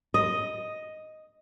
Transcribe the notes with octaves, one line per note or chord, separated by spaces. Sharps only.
D#5